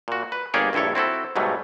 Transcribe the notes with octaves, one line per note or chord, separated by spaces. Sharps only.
A#2 F#4
B4
G1 A#3 G4 G#4 C#5 D5
A#1 G2 E4 A4 C#5
C4 E4 F#4 A4
G#2 B2 F#3 G3 A3